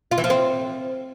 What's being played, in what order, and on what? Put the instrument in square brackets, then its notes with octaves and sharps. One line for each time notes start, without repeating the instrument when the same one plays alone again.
[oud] F4
E3
F3
C4